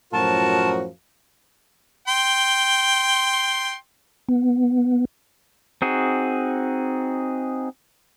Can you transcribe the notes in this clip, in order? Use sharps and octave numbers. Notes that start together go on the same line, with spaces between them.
F#2 A2 F3 F#4 A#4 A5
G5 C6
B3
C4 D#4 F#4 G#4